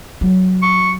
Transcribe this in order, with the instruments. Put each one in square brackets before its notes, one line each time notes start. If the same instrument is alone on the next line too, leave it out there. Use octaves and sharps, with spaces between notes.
[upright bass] F#3
[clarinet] C#6